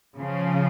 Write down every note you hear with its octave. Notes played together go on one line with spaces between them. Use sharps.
C#3 F3